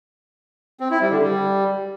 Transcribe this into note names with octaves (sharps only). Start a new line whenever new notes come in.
C4
E4
G3
D3
G3